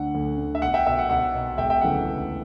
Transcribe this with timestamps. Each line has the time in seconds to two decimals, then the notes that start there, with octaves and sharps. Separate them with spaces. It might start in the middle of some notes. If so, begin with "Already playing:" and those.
Already playing: D2 D3 F#5
0.15 D2
0.38 D3
0.55 E5
0.62 B1 F#5
0.74 E5 G5
0.86 B2 E5
0.99 F#5
1.10 B1 F#5
1.34 B2
1.58 E1 E5 G5
1.70 E5 G5
1.81 D2 C#3 E3 F#5
2.05 E1